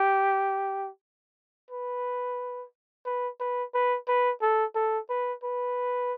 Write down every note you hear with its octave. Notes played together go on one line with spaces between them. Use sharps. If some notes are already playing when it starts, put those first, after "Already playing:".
Already playing: G4
B4
B4
B4
B4
B4
A4
A4
B4
B4